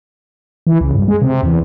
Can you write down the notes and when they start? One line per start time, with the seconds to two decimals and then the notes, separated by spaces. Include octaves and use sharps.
0.67 E3
0.81 C#2
0.95 G2
1.08 G#3
1.22 C3
1.43 E2